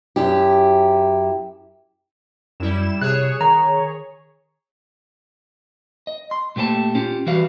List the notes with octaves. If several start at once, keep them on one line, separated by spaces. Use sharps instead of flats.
F#2 E4 G4
F#2 G3 E4 E7
C3 G#4 C#5 F#6
D#3 A#5
D#5
C6
A#2 A3 G4 B4 A5
C#4 F4 G4
E3 G3 F#4 B4 F5